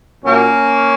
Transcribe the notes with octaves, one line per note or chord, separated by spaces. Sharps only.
A#2 F#3 A#3 C#4